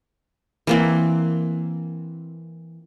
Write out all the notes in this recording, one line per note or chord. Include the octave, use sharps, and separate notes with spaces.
E3 A#3 C4